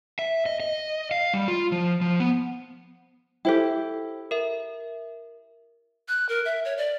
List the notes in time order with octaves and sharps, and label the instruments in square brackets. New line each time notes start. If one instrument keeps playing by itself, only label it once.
[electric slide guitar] E5
D#5
D#5
F5
G3
F4
F3
F3
B3
[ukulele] E4 G4 [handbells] A4 C5 G5
[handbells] A#4 E5
[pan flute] F#6
A#4
E5
C#5
D5